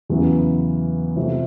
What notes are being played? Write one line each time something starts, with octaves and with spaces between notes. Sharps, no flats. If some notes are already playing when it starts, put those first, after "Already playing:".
E2 C#3 F#3 B3 E4
F2 C3 F3 A3